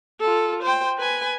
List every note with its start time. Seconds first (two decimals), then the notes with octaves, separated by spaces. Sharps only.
0.20 F4 A4
0.63 C5 G5
0.98 B4 G#5